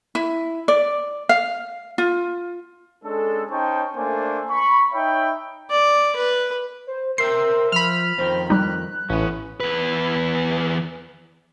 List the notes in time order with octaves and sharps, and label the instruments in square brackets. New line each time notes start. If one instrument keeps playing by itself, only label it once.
[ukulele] E4
D5
F5
F4
[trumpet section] G#3 C#4 D4 A4
C#4 D#4 C5 G5 A5 C#6
A3 A#3 D4 A4 C5 G#5
B5 C#6
D#4 C#5 E5 G5 B5
[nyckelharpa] D5
B4
[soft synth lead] C5
[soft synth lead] A#4 [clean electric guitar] C5 E5 G5 [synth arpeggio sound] C7
[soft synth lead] F3 [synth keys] B5 F6
[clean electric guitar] F2 D#3 [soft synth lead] C5
[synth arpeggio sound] G3 D#4 [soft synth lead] F#6
[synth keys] A1 [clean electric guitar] B3 C#4
[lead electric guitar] E2 B4